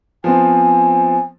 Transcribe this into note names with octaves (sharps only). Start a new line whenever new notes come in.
F3 B3 C4 G#5